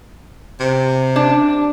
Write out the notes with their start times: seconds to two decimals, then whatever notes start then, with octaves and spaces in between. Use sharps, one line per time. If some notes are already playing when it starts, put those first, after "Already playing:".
0.60 C3
1.16 D4